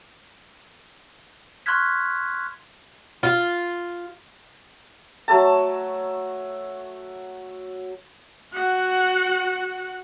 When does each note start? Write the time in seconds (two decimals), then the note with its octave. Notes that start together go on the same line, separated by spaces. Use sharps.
1.66 C6 C#6 F6 F#6 G#6 B6
3.23 F4
5.28 F#3 A3 A5
8.54 F#4 F#5